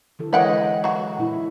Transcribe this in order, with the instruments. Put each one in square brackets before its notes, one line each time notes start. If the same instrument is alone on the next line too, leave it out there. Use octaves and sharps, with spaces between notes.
[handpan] D3 E3 A4
[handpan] G#3 C#5 D#5 [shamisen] B4 F#5 G5
[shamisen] F#3 F#4
[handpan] A#2 E4